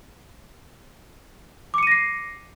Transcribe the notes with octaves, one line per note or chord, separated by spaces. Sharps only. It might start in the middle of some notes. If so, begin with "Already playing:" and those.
D6 A#6 C7 C#7 D#7